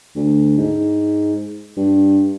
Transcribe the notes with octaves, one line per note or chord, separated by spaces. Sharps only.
D2
G#2
G2